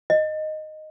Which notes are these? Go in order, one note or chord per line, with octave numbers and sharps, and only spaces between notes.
D#5